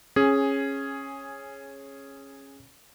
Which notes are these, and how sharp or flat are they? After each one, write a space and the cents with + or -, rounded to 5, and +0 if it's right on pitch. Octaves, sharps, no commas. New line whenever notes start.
C#4 -15 G#4 +0